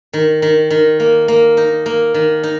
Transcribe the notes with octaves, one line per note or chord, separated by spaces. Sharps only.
D#3
D#3
D#3
A#3
A#3
D#4
A#3
D#3
D#4